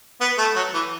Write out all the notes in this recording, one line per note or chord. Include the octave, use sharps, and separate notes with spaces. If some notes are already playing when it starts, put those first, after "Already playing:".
B3
A3
F#3
E3